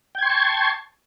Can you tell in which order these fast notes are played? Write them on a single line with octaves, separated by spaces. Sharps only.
G5 G#6 C6 C#6 A5